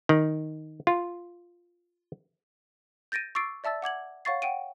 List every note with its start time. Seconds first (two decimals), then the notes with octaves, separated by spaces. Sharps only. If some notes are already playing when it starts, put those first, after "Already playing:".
0.09 D#3
0.87 F4
3.12 G6 A6 A#6 D7 D#7
3.35 C#6 D6 E6 A6 C7 D7
3.64 D5 E5 A5 E6 A6
3.82 F#5 D6 G#6 F#7
4.25 C#5 F5 F#5 C#6 A6 C7
4.42 F#5 G5 D7 D#7